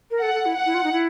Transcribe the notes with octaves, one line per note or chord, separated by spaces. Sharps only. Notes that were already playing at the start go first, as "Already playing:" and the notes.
A#4
A4 F#5
A4
E4
F#5
E4
F4
D#4
E4